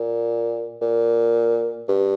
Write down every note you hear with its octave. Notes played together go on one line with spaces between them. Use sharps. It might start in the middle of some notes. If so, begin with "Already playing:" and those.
Already playing: A#2
A#2
G2